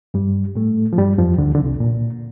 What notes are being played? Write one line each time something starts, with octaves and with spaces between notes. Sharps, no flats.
G2 G3
A2 A3
F3
G2 G3
F2 F3
D2 D3
D3
C2 C3
A#2